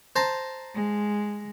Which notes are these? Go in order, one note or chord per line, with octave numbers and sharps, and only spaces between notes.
C5 A5 A#5
G#3